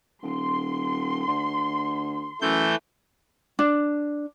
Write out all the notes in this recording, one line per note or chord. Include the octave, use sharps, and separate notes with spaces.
D#1 C6
D2
F#2 E3 A3 G6
D4